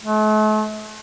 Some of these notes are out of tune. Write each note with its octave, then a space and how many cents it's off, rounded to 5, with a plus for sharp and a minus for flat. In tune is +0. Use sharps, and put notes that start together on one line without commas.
A3 -45